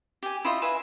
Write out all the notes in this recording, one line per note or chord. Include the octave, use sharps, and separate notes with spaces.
G4 G#5
E4 F4 D#5
B4 E5 F5 G#5